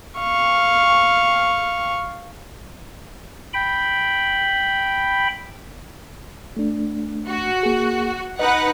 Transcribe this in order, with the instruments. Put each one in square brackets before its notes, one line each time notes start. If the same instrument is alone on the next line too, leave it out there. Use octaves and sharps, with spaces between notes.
[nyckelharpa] F5 C#6
[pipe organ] G5 B5
[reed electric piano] A3 D4
[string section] F#4
[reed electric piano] A#3 G#4
[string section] D#4 B4 F#5 [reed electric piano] D#5